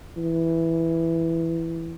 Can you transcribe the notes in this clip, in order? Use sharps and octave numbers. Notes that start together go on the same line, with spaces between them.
E3